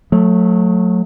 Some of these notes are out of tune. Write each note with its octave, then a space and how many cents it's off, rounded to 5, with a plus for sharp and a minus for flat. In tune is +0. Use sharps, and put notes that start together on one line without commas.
F#3 -30 A3 +0